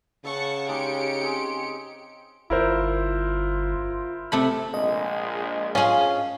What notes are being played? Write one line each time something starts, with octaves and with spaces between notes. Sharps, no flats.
C#3 F#5 A5 C#6 E6
G#3 D#4 G4 D6 C#7 D7
C4 G#4
G1 E4 F4 A#4 C5
C3 A3 B5
A#1 G#3 D#5
F3 C#4 F4 G#4